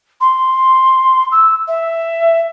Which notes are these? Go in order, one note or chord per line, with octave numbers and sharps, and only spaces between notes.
C6
E6
E5